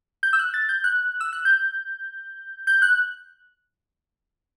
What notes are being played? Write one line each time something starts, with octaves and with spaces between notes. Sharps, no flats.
G6
E6
F#6
A6
G6
F#6
E6
F#6
G6
G6
F#6